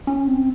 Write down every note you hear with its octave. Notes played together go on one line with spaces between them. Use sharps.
C#4
C4